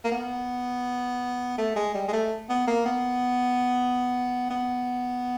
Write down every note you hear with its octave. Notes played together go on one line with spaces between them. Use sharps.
A#3
B3
A3
G#3
G3
G#3
A3
B3
A#3
B3
B3